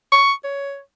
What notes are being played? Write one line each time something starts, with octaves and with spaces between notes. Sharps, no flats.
C#6
C#5